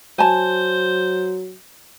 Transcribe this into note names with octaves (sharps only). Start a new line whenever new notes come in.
F#3 C5 G#5 A5